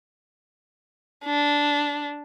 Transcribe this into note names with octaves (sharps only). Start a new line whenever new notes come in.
D4